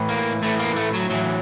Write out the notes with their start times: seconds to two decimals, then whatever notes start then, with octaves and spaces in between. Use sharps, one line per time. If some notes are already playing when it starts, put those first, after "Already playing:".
Already playing: A2 E3
0.09 A#3
0.43 A2 E3 A3
0.59 A#3
0.76 A3
0.94 F#3
1.10 A2 E3 F#3